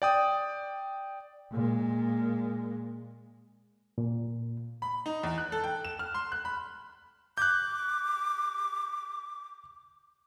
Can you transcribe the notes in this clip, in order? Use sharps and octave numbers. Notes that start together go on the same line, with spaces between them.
D5 G5 D#6
A#2 G#3
A#2
B5
D#4
E2
F#6
A4
G5
E7
F6
C6
F#6
B5
D6 F#6 G6